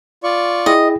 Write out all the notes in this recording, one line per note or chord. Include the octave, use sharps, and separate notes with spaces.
F4 D5 C#6
E4 G#4 D#5 G5